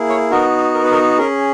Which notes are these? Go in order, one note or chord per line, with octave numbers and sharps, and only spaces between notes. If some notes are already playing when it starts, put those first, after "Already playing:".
Already playing: A#3 E4 G#4
C#5
B3 D#4 F#4 A#4
A#4
B4
A#4
C#4 G#4 A#4